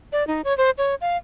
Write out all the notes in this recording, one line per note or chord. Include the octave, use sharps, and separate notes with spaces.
D5
D#4
C#5
C5
C#5
F5